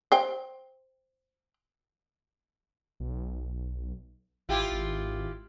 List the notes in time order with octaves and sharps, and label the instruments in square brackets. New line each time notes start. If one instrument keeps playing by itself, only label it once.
[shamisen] C5 G5
[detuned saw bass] B1
[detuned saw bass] G#1 [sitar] E4 F4 G4
[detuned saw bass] G#1